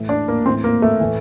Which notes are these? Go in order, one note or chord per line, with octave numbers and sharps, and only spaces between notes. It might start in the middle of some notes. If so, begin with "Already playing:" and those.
Already playing: A2 E3
D4
A#3
A2 E3 C4
A#3
A3
A2 E3